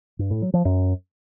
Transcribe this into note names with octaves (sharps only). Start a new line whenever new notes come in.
G2
A2
F#3
F3
F#2